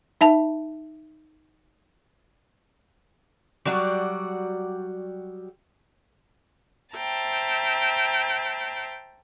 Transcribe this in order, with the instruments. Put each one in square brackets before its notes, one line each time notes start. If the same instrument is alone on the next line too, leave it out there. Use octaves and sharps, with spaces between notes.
[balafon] D#4 E5 A5
[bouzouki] F#3 G3 F#4 D5
[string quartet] C5 E5 G5 A5 A#5